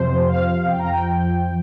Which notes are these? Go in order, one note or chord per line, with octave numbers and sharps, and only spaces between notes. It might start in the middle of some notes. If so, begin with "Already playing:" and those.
Already playing: F2 C3 F3 C5
F5
F2 F3 G5
A#5
G5